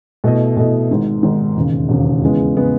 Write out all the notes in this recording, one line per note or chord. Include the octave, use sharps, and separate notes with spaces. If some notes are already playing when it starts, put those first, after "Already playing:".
B2 A3 E4 A4 D#5
B2 A3 E4 A4 D#5
G#1 G#2 D#3
G#1 G#2 D#3
E1 D#2 C#3
E1 D#2 C#3
E2 C#3 G#3 B3
C#3 G#3 B3